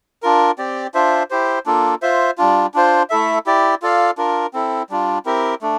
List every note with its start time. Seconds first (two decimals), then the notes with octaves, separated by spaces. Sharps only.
0.22 D4 F4 A#4
0.58 C4 G4 D5
0.94 D4 F4 C5 E5
1.31 E4 G4 C5
1.66 A#3 D4 F4 A4
2.02 F4 C5 E5
2.38 G3 D4 F4
2.74 D4 F4 C5
3.10 A3 E4 A4 E5
3.46 E4 G4 D5
3.82 F4 A4 D5 F5
4.18 D4 F4 A#4
4.54 C4 E4 A4
4.90 G3 D4 F4
5.25 C4 E4 G4 A#4
5.62 A3 D4